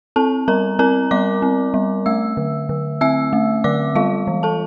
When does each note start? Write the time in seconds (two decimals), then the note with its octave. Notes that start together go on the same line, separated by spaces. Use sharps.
0.16 C4 A4 A5
0.48 G3 A#4 A#5
0.79 C4 A#4 A#5
1.11 G3 D5 D6
1.42 C4
1.74 G3
2.06 A3 E5 E6
2.37 D3
2.69 D3
3.01 C4 E5 E6
3.33 A3
3.64 D3 D5 D6
3.95 G3 F4 F5
4.27 E3
4.43 A4 A5